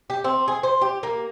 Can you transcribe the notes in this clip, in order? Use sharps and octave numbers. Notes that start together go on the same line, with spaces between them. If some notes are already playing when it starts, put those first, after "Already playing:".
G4
C4
G#4
C5
G4
A#3